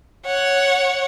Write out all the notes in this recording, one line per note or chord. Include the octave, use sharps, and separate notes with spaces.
C#5 F#5